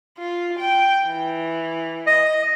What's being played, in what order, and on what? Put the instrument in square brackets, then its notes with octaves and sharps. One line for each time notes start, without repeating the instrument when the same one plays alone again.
[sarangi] F4
G5
E3
[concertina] D#5